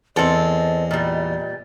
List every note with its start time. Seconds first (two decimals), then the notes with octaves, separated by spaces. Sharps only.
0.16 E2 C4 A4 D#5
0.91 A#2 G3